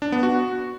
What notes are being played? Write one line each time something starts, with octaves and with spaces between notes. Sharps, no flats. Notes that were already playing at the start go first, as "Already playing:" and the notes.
D4
B3
F#4